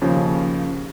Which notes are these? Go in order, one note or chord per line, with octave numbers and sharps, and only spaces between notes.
D#2 C#3 F3